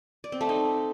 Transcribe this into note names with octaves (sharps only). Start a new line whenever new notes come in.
D5
C4
A3
D#4